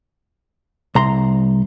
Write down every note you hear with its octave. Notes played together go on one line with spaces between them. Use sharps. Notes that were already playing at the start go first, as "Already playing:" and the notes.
C2 A#5 C6